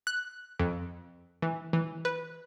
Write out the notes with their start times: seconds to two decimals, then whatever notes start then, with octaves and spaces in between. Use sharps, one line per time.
0.07 F#6
0.60 F2
1.42 E3
1.73 E3
2.05 B4